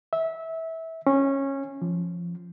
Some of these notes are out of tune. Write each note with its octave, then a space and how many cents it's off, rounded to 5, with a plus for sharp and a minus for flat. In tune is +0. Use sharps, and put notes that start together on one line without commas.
E5 -20
C#4 -15
F3 -15